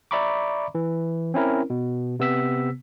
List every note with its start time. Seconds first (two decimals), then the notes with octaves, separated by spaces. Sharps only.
0.11 D5 E5 A#5 B5 C#6 D6
0.75 E3
1.34 C4 C#4 E4 A#4
1.70 B2
2.20 C3 B3 E6 B6